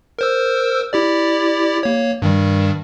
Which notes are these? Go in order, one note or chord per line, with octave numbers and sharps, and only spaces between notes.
A#4 C5 E6
E4 G4 D5
A#3 C#5
G2 D#3 G3